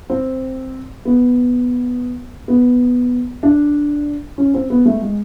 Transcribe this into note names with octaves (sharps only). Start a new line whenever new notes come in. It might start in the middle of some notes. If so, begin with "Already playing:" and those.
C4
B3
B3
D4
C#4
C4
B3
A3
G#3